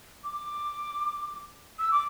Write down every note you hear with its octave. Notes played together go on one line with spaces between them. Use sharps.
D6
E6
D6